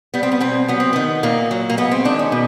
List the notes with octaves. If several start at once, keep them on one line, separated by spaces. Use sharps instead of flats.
G3 B3
C4
B3
B2 C4
F#3 B3
C4
D#3 B3
A#2 A#3
F#3
A#3
G#3 B3
C4
D#3 D4
C#4
B2